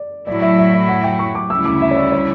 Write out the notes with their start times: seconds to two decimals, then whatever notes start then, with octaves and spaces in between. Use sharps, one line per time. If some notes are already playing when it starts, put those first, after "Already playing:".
Already playing: D5
0.27 A2 F#3 A3 E4 D5
0.42 E5
0.59 E5
0.74 E5
0.89 F#5
1.04 G5
1.19 C#6
1.35 D6
1.50 D2 C#3 G3 C#4 E4 E6
1.65 D6
1.82 E5
1.91 C#5
1.96 D5
2.12 C#5